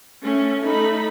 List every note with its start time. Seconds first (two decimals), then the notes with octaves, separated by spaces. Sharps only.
0.22 A3 C#4
0.65 A3 D#4 A4 B5